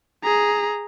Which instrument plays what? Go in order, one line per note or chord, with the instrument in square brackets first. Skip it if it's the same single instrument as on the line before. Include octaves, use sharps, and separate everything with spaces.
[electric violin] G#4 A#5